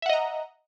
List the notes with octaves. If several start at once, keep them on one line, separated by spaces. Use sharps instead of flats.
D#5 E5 F#5 A#5